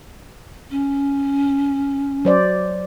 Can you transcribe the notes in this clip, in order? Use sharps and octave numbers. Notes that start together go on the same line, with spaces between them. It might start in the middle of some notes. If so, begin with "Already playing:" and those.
C#4
F#3 C5 D5